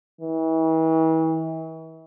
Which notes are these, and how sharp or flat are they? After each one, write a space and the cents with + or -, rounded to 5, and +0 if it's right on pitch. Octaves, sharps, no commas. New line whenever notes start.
E3 -40